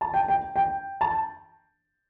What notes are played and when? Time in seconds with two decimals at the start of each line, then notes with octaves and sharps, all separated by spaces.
0.01 A5
0.14 G5
0.28 G5
0.56 G5
1.01 A5